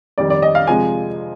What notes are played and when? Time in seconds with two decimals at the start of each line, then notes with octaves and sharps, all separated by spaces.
0.18 F2 D#3 G3 D5
0.30 D5
0.42 D#5
0.55 F5
0.67 C3 F3 G#3 G#5